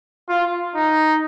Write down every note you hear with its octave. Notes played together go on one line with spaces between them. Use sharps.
F4
D#4